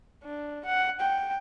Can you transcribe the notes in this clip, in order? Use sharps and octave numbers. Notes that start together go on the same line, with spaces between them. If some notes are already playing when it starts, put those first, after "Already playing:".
D4
F#5
G5